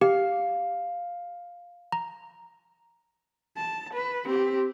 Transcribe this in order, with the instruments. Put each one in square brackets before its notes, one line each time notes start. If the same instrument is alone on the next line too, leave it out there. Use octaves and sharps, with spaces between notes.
[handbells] G4 [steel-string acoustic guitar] F5
[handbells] A#5
[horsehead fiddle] A5
B4
C4 G4